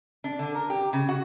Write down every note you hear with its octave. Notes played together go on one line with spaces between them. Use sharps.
D4
D3
A#4
G4
C#3
F#4